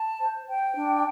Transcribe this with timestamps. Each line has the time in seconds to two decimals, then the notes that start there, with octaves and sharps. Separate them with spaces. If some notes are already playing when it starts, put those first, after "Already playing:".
Already playing: A5
0.20 C5
0.47 C5 G5
0.74 D4